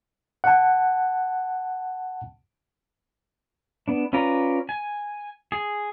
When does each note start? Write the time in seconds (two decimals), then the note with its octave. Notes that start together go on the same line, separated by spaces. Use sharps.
0.44 F#5 A5
3.88 B3 D4
4.13 C#4 F4 B4 D5 A#5
4.69 G#5
5.52 G#4